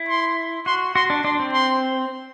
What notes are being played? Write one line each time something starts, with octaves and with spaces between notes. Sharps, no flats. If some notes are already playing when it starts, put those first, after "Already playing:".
Already playing: E4
C6
F#4 C6
F#4 C6
D4
D4 C6
C4
C6